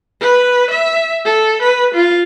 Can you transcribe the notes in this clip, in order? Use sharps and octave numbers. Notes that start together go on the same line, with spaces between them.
B4
E5
A4
B4
F4